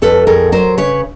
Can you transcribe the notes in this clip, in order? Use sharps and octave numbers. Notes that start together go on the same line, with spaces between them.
F2 A4 B4
F2 G#4 A#4
F#3 A#4 C5
C#3 B4 C#5